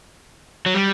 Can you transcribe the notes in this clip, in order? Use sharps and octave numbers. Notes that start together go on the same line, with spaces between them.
F#3
G3